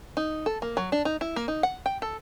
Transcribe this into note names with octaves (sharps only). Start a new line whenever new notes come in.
D#4
A4
A#3
F#3
D4
D#4
E4
A#3
D#4
F#5
G5
A4